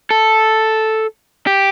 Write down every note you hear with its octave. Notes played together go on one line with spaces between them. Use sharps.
A4
G4